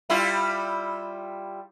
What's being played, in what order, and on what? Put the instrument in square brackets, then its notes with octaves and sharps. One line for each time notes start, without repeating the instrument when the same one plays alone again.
[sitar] G3 E4 F4